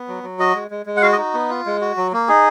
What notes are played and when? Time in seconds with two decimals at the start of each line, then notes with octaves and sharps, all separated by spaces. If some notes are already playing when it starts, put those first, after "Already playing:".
Already playing: B3
0.08 F#3
0.23 F#3
0.39 F#4 D#5
0.55 G#3
0.71 G#3
0.86 G#3
0.97 F#5
1.02 F#4 F5
1.12 D#5
1.18 D#4
1.34 B3
1.50 F4
1.66 G#3
1.81 F#4
1.97 F#3
2.13 A#3
2.28 D#4 G#4